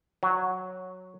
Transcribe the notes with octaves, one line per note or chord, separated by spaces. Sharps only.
F#3